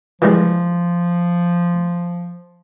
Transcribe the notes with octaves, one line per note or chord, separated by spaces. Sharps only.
E3 F3 G3 G#3